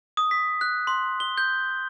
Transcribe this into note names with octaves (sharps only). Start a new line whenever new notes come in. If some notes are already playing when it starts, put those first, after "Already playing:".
D#6
B6
F#6
C6
G7
G6